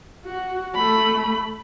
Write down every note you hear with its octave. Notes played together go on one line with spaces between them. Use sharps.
F#4
A3 B5